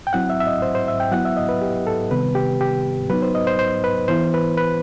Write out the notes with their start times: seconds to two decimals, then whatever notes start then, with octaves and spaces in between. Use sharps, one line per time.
0.07 G5
0.13 F#3 C4 E4 F#5
0.30 E5
0.40 E5
0.47 D#5
0.62 C5
0.75 C5
0.88 E5
1.00 G5
1.12 F#3 B3 E4 F#5
1.25 E5
1.37 D#5
1.49 B4
1.62 G4
1.87 A4
2.11 C3 D#3 G3 B3 B4
2.35 G4
2.61 G4
3.10 F#3 B3 D#4 B4
3.22 C5
3.35 D#5
3.47 C5
3.59 C5
3.84 B4
4.08 E3 B3 E4 C5
4.34 B4
4.57 B4